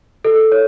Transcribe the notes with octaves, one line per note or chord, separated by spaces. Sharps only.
A4
C#5